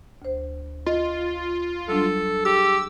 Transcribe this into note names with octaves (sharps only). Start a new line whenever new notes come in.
D2 C5
F4 D#5
F#3 G3 D4 A4
G4 G#4 E6